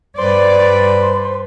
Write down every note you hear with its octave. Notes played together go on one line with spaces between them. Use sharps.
G2 B4 C5 D5